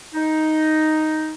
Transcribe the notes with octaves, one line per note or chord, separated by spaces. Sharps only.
D#4